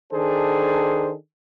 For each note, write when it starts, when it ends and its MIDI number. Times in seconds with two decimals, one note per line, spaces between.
0.13 1.14 51
0.13 1.14 62
0.13 1.14 68
0.13 1.14 69
0.13 1.14 72